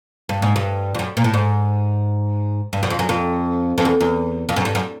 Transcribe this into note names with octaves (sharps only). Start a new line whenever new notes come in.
G2
G#2
G2
F2
F#2
A#2
A2
G#2
G2
F#2
F2
F#2
F2
F2
E2
E2
F2
F#2
G2
F#2